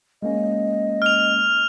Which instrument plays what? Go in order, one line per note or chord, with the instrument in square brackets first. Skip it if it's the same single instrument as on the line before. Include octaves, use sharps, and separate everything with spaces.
[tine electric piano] G#3 A#3 C#4 [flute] D#5
[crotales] F6 F7